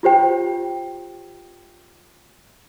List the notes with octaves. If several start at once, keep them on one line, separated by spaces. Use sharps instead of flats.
F4 G4 C5 G5